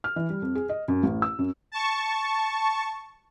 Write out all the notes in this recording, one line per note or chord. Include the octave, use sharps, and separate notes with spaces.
F6
E3
G3
F2
G#4
D#5
F#2
A1
E6
F#2
A5 C#6